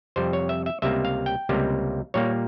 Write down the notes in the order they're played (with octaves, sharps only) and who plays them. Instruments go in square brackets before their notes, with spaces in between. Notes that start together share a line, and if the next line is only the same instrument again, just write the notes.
[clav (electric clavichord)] F2 C3 G3 C5
C#5
E5
E5
C#2 C3 G3 A#3 E5
F5
G5
C#2 C3 G3 A#3
A#2 G3 A#3 C#5